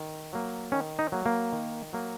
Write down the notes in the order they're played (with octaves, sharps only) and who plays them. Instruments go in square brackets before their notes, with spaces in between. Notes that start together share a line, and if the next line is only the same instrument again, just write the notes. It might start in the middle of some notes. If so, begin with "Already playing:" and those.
Already playing: [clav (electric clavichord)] D#3
F#3 A#3
D#3 C#4
D#4
F#3 A#3
A#3
D#3
F#3 A#3